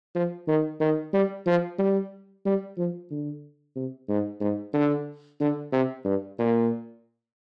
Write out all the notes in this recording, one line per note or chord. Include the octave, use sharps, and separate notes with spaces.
F3
D#3
D#3
G3
F3
G3
G3
F3
D3
C3
G#2
G#2
D3
D3
C3
G2
A#2